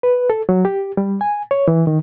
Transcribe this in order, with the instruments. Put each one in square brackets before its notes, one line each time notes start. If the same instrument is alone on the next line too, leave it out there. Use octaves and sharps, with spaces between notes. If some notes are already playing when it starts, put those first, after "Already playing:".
[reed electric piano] B4
A4
F#3
G4
G3
G#5
C#5
E3
D#3